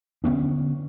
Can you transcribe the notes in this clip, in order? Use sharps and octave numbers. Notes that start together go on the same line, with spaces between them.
D3 B3 C#4 D4